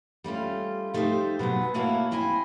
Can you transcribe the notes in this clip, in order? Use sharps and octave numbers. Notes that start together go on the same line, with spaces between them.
G3 A3 C#4 F4
F3 A3 D#4 F4 G4 C5
B2 F#3 G#3 B3
A3 A#3 E4 F#4 C#5 F5
C4 E4 D#5 G#5